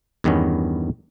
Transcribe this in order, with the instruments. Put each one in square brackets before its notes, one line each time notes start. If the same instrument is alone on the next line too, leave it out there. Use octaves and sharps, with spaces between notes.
[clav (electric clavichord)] E2 G2 D#3 B3 C#4